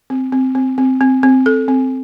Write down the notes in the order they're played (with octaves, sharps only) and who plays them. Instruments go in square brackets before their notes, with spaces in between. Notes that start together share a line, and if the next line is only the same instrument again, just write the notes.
[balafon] C4
C4
C4
C4
C4
C4
A4
C4